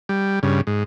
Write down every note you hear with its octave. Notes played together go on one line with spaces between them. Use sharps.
G3
G2 C#3
G#2